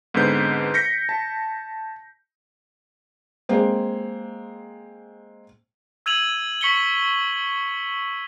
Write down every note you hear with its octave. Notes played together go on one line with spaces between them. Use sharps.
G#2 D3 B3 C4 B4 G6
G6 A#6 B6 C#7
A5
G#3 A#3 C4
E6 G#6 D#7 F7 F#7
C#6 B6 C#7 F#7 G7